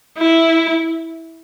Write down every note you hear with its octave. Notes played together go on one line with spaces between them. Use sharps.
E4